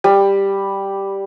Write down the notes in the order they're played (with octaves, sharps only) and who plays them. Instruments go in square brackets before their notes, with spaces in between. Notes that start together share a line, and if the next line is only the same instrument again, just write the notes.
[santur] G3